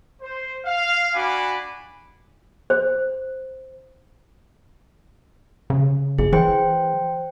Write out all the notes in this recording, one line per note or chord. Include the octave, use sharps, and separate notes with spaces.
C5
F5
D4 F#4 G#5 B5 D6
C5
C#3
G1 G#4
E3 C5 G5